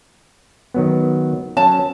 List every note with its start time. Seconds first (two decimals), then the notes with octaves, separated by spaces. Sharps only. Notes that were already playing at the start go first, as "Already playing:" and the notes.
0.74 D#3 F#3 B3
1.57 F#3 C#4 A5